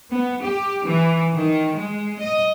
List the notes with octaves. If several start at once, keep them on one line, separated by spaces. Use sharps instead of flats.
B3
G4
E3
D#3
G#3
D#5